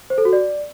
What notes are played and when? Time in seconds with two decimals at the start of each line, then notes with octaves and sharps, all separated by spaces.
0.10 C5
0.18 A4
0.25 F#4
0.33 D5